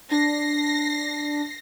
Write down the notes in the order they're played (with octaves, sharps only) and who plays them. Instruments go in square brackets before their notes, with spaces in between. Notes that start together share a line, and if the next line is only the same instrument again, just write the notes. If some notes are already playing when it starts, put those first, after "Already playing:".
[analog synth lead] D4 [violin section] A#6 C7